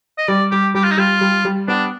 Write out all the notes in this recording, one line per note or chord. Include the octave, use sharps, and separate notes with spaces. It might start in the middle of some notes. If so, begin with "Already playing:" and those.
D#5
G3 D5
G3 G4
G3 G4
F4
D#4
G3 F4
G3
G3
B3 D4